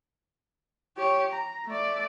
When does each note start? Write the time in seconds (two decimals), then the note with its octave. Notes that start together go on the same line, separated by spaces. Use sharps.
0.97 G4 C#5
1.32 A#5
1.66 A3 D5